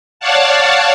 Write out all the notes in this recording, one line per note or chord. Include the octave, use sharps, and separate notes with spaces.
C#5 D5 F5 F#5 A5